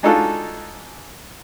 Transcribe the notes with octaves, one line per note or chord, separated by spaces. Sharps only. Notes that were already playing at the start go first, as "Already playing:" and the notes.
G#3 D4 D#4 F4 F#4 A4